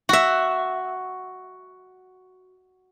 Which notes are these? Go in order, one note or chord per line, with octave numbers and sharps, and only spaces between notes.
F#4 E5